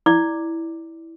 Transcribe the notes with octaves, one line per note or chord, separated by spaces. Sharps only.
E4 D5 D6